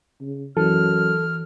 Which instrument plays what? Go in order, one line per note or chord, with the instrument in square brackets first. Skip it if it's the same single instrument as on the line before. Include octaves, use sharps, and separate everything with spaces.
[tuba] C#3
[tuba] F#2 [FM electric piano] E3 [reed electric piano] A4 [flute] F6